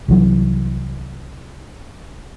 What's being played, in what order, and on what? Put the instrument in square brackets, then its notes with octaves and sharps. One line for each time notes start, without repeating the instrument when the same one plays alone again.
[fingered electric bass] C2 E3 F#3